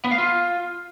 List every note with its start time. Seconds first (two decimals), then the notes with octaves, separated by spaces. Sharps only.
0.04 B3
0.11 F5
0.18 F4